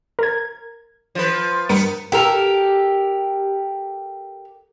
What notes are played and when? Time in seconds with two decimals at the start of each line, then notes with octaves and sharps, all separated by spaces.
0.19 A#4 G#6
1.15 F3 B4
1.69 G2 B3 A#4 C#7
2.12 G4 A4 A#4